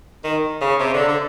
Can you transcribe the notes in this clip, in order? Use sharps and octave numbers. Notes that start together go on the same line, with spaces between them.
D#3
C#3
C3
D3
D3